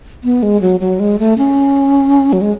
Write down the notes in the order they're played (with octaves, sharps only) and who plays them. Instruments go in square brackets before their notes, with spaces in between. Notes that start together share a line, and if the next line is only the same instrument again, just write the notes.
[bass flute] B3
G#3
F#3
F#3
G#3
A3
C#4
F#3
G#3